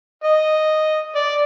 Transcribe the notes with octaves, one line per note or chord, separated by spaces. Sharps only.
D#5
D5